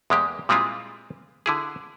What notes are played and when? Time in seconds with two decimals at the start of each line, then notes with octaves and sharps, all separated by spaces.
0.10 E2 G#3 A#3 G4
0.49 A#2 G3 G#3 C4 E4 F4
1.46 D3 E4 G#4